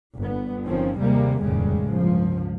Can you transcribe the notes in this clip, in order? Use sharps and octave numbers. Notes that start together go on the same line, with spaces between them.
G1 B3
G1 D#3 F3 C4 C#4
D#2 C3 G3 G#3 A#3
F1 D#2 A2 C#3 G3 G#3
G1 C#2 F3